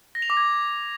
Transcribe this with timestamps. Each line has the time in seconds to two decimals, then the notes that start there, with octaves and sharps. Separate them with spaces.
0.15 A#6
0.22 F7
0.30 D6
0.37 G#6